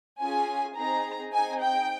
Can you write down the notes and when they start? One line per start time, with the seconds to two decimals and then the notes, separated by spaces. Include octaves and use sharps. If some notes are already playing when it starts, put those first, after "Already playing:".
0.20 C#4 F4 G#4 G#5
0.76 C4 D#4 G#4 A#5
1.33 C4 D#4 G#4 G#5
1.61 G5